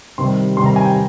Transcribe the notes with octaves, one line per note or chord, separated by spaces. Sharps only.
C3 D#3 G3 C6
C3 D#3 G3 C6
A#5
G#5
G5